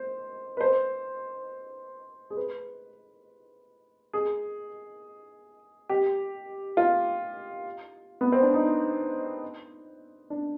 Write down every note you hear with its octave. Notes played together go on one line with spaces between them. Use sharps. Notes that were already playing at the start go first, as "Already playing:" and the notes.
Already playing: C5
B4
C5
G#4
B4
G#4
G4
F4
B3
C4
D4
D#4
D4